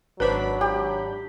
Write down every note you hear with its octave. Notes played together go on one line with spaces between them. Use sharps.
G#1 F#3 D4 B4 C5 B5
G4